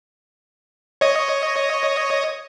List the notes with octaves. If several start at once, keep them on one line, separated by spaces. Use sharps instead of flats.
C#5 D#5